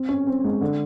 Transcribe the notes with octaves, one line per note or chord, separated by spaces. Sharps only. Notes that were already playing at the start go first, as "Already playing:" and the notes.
Already playing: C4
C#4
C4
G#3
D3